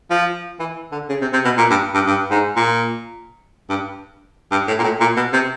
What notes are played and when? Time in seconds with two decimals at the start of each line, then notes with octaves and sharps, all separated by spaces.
0.10 F3
0.60 E3
0.92 D3
1.09 C#3
1.21 C3
1.33 C3
1.45 B2
1.58 A#2
1.70 G2
1.94 G2
2.07 G2
2.31 G#2
2.56 A#2
3.69 G2
4.52 G2
4.67 A2
4.79 A#2
4.84 A2
5.00 A#2
5.16 B2
5.33 C3